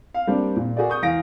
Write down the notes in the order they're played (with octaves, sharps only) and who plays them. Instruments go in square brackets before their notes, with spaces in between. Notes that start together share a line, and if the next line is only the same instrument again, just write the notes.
[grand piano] F5
G3 A#3 C4 D4
A#2
F#4 G#4 A#4 D5
C#6 D#6 G6
E2 F5 A#6 D7